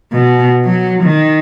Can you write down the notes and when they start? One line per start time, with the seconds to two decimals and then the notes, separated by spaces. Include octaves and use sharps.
0.12 B2
0.64 F#3
1.03 D#3